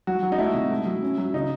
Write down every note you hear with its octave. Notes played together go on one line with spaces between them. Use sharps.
F#3 F#4
F#3
D#4
A3 E4
C3
A3
F#3
C#4
F#3
C#3 D#4